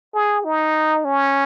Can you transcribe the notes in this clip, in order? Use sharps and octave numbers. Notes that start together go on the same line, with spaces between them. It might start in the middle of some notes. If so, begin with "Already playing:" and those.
G#4
D#4
C#4